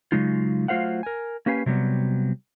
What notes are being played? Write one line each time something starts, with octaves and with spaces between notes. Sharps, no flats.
C#3 F#3 G#3 D#4 F4
F#3 A3 F4 C5 F5 F#5
A#4 G#5
A#3 C#4 G4 B4 F5 G#5
C3 F#3 G3 B3 F#4